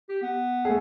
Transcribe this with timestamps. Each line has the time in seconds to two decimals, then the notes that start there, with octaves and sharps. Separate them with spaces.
0.09 G4
0.22 B3
0.65 A3 G#4